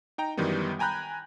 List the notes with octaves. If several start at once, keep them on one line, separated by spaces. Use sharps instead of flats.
D#4 G5 A#5
F#2 D#3 E3 G3 B3
G5 G#5 A#5 B5 F#6 G6